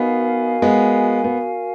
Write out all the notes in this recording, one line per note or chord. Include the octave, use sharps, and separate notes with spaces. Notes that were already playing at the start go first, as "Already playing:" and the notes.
Already playing: B3 D#4 F#4 A#4 F5 G#5
G#3 B3
B3